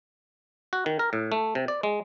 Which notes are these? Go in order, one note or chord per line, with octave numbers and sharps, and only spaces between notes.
F#4
D#3
A#4
A2
A3
C3
D5
G#3